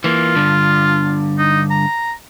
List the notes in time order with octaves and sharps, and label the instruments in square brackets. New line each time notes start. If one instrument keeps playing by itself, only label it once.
[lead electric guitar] E3 A#3 [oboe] F4
[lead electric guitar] G2 D3
[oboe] D#4
A#5